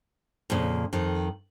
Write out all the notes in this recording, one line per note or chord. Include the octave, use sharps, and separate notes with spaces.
F2 A#2 C#3
F2 D#3